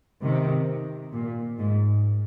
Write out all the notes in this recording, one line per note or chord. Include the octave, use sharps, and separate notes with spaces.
C3 D#3
A#2
G#2